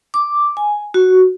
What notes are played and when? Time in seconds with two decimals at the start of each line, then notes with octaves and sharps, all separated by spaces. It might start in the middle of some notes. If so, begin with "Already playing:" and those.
0.14 D6
0.57 G#5
0.94 F#4